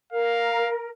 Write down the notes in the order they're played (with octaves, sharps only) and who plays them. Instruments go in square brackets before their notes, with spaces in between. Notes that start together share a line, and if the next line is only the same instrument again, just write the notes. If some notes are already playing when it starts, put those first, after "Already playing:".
[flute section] A#4 [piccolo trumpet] F5